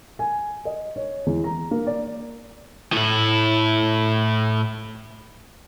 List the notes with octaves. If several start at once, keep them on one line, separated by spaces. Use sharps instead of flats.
G#5
D#5
C#5
E2
A#5
A#3
D5
A2 E4